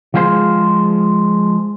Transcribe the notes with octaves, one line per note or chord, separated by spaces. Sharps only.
F3 G#3 F4 G#4 C5